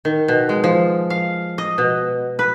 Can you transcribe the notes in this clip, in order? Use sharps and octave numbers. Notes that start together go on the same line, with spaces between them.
D#3
B2
G#3
F3
F5
D#5
B2
B4